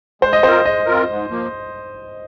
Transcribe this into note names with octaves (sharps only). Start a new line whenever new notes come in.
G#3 C5
D#5
C4 F4 A#4 C5
G#3 D#5
C4 F4 A#4
G#2
F3 A#3